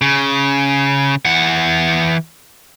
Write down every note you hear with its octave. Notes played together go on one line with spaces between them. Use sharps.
C#3
E3 F#5